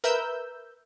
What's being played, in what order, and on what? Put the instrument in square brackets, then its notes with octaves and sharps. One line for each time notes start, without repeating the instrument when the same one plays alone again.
[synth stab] A#4 B4 E5 E6 G6